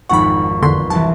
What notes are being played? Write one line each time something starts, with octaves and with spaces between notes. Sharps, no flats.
G#1 F2 D4 F#5 B5 C#6
E2 D3 B4 C6
C2 E3 A5